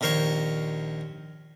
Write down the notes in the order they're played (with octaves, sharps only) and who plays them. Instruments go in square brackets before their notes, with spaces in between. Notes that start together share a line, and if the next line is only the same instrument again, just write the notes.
[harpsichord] A#1 D#2 A#4 C5 C#5 C#6